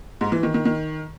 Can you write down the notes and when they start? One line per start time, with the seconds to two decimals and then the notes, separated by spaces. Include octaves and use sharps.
0.21 G#2
0.32 E3
0.43 D#3
0.54 D#3
0.65 D#3